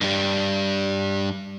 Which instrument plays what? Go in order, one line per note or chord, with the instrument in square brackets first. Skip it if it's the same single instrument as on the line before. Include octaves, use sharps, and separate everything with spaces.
[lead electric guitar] G2 G3